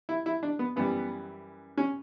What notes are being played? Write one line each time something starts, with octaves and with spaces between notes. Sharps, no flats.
E4
E4
D4
B3
F#2 E3 G3 B3
C#4